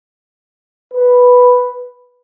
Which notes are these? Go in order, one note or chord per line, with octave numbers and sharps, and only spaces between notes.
B4